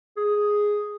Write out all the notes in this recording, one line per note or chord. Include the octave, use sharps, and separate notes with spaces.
G#4